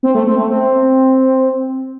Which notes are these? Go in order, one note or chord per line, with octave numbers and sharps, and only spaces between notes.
C4
A3
C4
A3
C4